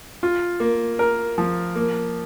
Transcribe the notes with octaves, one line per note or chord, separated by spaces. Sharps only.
F4
A#3
A#4
F3
A#3